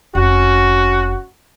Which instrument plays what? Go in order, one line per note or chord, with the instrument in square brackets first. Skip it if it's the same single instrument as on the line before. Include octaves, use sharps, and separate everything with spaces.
[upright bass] F1 [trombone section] C#4 F#4